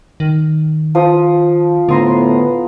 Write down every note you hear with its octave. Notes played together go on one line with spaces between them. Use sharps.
D#3
F3 D#6
A2 D3 B3 A#5 C6 D#6